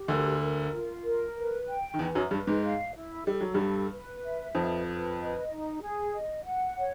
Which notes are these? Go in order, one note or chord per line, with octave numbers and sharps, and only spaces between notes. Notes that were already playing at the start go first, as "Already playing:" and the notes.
Already playing: G4
D2 D3 A#4
A#4
F4
A#4
B4
G5
D#3
E2 E3 B4
F#2 F#3
G2 G3 B4
G#2 G#3
F5
E4
G3 A4
F#3
G2 G3 A4
B4
E5
F2 F3 B4
B4
D#5
D#4
G#4
D#5
F#5
C#5